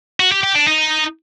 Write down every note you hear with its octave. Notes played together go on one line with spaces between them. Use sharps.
F#4
G4
G4
D4
D#4